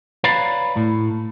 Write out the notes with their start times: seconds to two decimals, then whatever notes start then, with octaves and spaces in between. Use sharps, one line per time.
0.24 B4 C#5 D5 F5 A#5 B5
0.76 A2